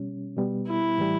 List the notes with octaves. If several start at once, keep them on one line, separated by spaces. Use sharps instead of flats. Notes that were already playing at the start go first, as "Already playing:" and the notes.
Already playing: B2 G3 C#4
B2 G3 B3
E4
A2 E3 G3